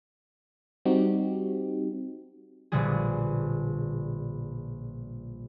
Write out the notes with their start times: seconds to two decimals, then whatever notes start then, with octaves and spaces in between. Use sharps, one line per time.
0.85 G3 C4 D#4 F#4 G4
2.72 A#1 B2 D3 G3 G#4